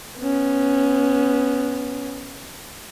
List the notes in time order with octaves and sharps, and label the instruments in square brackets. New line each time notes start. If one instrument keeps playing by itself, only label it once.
[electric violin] B3 C#4